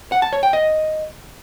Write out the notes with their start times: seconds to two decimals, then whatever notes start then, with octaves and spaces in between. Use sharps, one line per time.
0.12 F#5
0.22 A5
0.33 C#5
0.43 G5
0.53 D#5